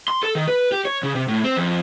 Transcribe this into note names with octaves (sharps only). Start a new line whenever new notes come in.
C6
A4
D#3
B4
G4
C#5
C#3
C3
A2
C4
F2